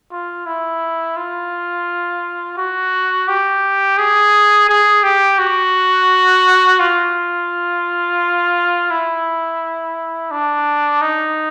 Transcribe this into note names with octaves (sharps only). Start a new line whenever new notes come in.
F4
E4
F4
F#4
G4
G#4
G#4
G4
F#4
F4
E4
D4
D#4